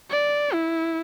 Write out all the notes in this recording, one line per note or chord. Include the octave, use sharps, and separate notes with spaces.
D5
E4